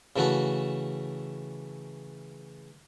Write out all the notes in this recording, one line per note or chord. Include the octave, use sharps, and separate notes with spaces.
C#3 E3 A3 F#4 A4